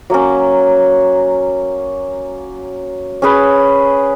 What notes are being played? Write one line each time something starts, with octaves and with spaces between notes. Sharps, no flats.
F#3 A#3 C#4
C#4 G#4 B4